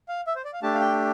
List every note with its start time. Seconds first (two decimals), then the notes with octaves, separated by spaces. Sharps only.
0.09 F5
0.27 E5
0.36 C5
0.45 D5
0.53 F5
0.63 A3 D4 G4 A5
0.75 F5
0.80 G5